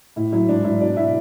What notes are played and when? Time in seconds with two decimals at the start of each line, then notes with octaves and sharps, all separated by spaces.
0.16 A2 E4
0.33 F#3 E4
0.49 G#2 D4
0.65 F#3 E4
0.80 B2 D4 D5
0.97 B2 E4 E5